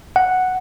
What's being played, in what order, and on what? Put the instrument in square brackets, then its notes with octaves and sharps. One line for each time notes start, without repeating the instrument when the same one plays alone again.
[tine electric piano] F#5